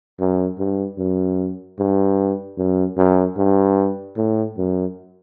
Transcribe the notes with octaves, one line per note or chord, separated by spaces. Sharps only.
F#2
G2
F#2
G2
F#2
F#2
G2
A2
F#2